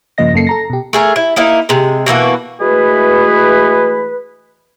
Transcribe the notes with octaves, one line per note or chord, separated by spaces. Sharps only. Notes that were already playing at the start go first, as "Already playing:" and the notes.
G2 C#3 F3 A#3 D#5 A#6
F#2 C#3 A#3 A4 C7 C#7
A4 A#5 A#6
B2 G4
A3 G#4 A#4
E4
A#3 D#4 E4
C3 G#3
B2 E3 A#3 F#4
E3 G#3 A3 F#4 G#4 B4